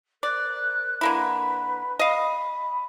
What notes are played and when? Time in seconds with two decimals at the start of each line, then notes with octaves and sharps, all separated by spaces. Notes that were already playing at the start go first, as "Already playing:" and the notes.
0.23 A#4 C5 D5 F#6
1.01 D3 A#3 E4 B4 B5
1.99 D#5 F5 B5